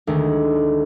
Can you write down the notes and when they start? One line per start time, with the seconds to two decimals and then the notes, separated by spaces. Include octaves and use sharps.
0.07 D2 D#3 G#3 A3